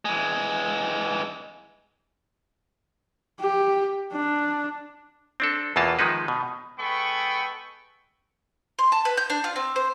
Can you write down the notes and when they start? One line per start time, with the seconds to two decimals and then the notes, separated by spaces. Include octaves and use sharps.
0.05 E3 G#3
3.40 G4
4.13 D4
5.40 C4 D4 A4
5.76 E2 B2 E3 A#3 F4 A5
5.99 D#3 F3 G#3 D#4 B4
6.28 B2
6.78 G#3 B3 A4 G5 B5 C#6
8.79 C6
8.92 A5
9.05 B4
9.17 G6
9.30 D4
9.44 F4
9.56 C4
9.76 C5